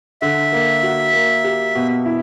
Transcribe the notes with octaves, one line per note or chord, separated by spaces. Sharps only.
D3 E5
A#3
F#4
A#3
G4
B2
E4